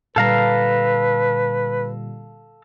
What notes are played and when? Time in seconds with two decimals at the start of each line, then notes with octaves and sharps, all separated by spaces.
0.16 A#2 D3 G3 A4 B4 F5 A#5